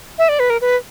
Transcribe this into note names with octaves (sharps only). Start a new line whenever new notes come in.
E5
D5
B4
A#4
B4